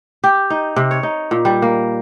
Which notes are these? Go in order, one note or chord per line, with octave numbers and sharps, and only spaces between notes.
G4
D#4
C3
C#5
D#4
A#2
G3
A#3